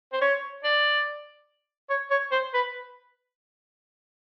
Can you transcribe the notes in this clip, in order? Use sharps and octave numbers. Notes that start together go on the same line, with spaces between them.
C5
C#5
D5
C#5
C#5
C5
B4